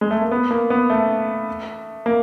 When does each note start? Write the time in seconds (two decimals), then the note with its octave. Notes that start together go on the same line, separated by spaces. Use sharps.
0.01 G#3
0.11 A3
0.22 A#3
0.31 B3
0.51 A#3
0.70 B3
0.90 A3
2.06 A#3